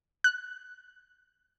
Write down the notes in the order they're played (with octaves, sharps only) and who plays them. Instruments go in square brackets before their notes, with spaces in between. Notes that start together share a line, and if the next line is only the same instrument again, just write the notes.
[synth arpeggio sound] F#6